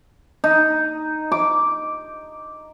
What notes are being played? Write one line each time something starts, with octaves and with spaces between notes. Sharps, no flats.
D#4
D6